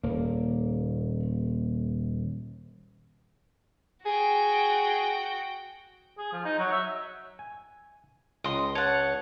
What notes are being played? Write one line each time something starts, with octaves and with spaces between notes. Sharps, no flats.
D#1 A#3
F#4 G#4 G5
G#4
F3
D#4
F#3
E5
G#5
C#2 D#5 C6
C#5 F#5 A5